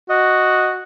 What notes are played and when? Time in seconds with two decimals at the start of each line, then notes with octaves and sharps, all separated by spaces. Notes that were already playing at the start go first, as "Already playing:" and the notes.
0.10 F#4 D#5